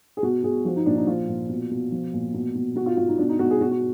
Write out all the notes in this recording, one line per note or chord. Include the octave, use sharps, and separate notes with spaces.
G#4
B2 F#4
B2 G#4
F3 F#4
D#4
A#2 D4
D#4
F3 F4
A#2
B2
B2
F3
A#2
B2
B2
B2 F#4
F4
B2 F4
D#4
B2 D4
D#4
B2 F#4
G#4
B2 F#4
F#4